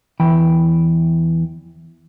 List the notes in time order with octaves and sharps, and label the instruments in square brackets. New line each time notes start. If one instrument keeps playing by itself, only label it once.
[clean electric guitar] E2 E3 G5 B5